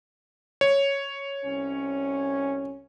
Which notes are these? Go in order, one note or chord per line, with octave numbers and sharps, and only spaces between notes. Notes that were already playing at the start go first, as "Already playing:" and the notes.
C#5
C2 C#4